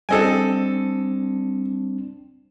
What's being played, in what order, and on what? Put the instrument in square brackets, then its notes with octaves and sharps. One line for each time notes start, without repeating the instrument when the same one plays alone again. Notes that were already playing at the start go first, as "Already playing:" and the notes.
[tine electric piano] G3 C4 D4 [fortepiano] A4 D#5 G#5